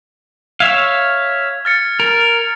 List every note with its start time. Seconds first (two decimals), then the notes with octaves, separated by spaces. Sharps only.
0.60 C#5 E5 F5 G#6
1.65 F6 A6 C#7
2.00 A#4